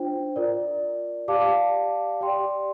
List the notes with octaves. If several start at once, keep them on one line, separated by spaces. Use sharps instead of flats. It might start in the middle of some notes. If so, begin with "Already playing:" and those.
Already playing: D4 F4 C5 G5
F4 A#4 D5
G4 D5 F5 A5 D6
G4 D5 G5 C6